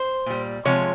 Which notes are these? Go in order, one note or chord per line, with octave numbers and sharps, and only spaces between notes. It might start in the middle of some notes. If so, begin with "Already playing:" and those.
Already playing: C5
A#2 G3
C3 F3 G#3 C#5